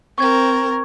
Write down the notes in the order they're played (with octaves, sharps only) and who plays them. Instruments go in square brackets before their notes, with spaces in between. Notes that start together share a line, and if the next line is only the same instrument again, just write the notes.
[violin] C4 A#4 [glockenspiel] C#6 G#6